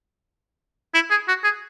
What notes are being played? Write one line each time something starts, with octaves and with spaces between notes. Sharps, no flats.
E4
G#4
F#4
G#4